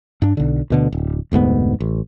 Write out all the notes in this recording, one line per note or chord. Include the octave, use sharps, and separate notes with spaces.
G2 D4
B1 D3
D2 B2 D3
D1
F1 D2 G#2 B3
A1